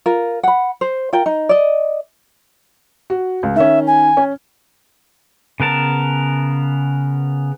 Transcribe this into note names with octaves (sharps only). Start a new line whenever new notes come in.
F4 A#4
F#5 B5
C5
F4 A#4 G5
D#4
D5 D#5
F#4
C#2
D#3 C#4 E5
G#5
C#4
C#3 B3 A#4 A5